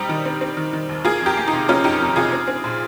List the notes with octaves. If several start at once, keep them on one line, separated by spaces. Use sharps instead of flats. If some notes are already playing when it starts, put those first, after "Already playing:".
Already playing: G3 C4 D#4 G4
D#3
C4
C4
D#3
D#3
D#2
A#3 F4 G#4
F2
G4 A#4
A#3
D#4
C3
A#3 C#4 F4
F2 D#4 G4
F2
C3 F4 G#4
C4
C4
A#2